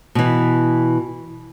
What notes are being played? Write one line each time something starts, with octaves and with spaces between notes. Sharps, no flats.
B2 E3